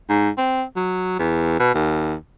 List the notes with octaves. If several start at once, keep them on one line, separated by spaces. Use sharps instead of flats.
G#2
C4
F#3
E2
B2
D#2